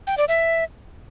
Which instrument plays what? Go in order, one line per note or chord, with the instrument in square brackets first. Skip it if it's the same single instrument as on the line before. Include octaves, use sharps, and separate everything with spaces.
[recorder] G5
D5
E5